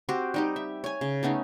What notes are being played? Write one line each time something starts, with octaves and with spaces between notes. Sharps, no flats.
C4 F#4 G4
G3 D#4 G4
E5
C#5 G#5
C#3
A3 B3 C#4 D#4